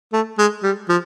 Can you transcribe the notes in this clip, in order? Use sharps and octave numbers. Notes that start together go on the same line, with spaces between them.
A3
G#3
G3
F3